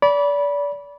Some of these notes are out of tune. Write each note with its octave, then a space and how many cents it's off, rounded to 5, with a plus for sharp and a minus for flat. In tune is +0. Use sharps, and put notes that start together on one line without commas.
D5 -30 B5 -15